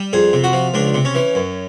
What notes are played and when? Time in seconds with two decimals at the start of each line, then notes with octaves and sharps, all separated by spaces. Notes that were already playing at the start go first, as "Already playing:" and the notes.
Already playing: G3
0.13 F2 G#4
0.33 C3
0.44 F#4
0.53 F3
0.74 C#2 D4
0.94 C3
1.05 C#4
1.15 E3
1.35 F#2